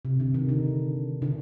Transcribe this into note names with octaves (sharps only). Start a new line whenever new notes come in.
C3
D3
D#3
D3
D3